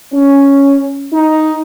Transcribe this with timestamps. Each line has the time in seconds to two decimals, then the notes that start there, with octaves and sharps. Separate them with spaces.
0.13 C#4
1.13 D#4